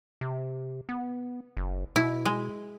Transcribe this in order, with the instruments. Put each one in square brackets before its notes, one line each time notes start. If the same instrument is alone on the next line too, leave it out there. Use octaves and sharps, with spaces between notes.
[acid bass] C3
B3
F#1
[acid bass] B2 [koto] E4
[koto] G#3